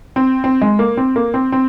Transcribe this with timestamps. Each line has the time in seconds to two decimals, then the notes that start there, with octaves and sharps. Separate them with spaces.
0.16 C4
0.44 C4
0.62 G#3
0.79 A#3
0.97 C4
1.16 A#3
1.34 C4
1.52 C4